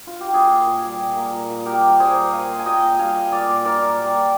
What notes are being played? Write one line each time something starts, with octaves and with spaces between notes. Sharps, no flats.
F4
G4
A#2 F4 G#4
A#2
A#2
G3
A#2
A#3
A#2
A#2
A#3 G4 A#4
G3
G3 G#4 C5
G3
A#3 F5 G#5
A#3
G#5
A#2 D#5 G5
A#2
G3 F5 G#5
A#2
A#2 D5 F5
A#2
A#3 A#4 D5
A#2
G3
A#2